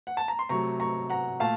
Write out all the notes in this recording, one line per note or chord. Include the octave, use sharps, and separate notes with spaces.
F#5
A5
A#5
C6
C3 F#3 A3 A#5 C#6
A#5 C#6
F#5 A#5
A#2 A3 F5 A5